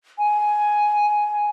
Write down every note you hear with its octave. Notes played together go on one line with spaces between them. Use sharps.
G#5